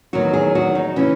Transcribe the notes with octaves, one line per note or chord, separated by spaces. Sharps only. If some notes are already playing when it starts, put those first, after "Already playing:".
E2 D#3 F#3 F#4
G#4
F#4
D#4
C#3 E3 C#4